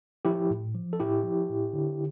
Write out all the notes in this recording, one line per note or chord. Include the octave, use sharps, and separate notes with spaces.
F3 E4 G4
A2
F3
A4
A2 E4 G4
F3
A2
D3